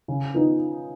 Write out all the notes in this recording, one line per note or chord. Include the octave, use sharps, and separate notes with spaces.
C#3
F3 B3 D#4